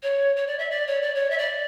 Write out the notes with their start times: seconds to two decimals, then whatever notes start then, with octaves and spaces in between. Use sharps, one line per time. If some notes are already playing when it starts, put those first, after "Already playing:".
0.02 C#5
0.36 C#5
0.47 D5
0.58 E5
0.70 D5
0.87 C#5
1.01 D5
1.14 C#5
1.30 E5
1.38 D5